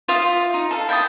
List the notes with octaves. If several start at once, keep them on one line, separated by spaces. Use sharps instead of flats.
F4 E5 F5 D#6
D#4
A4 F5
E4 G5 A5 D#6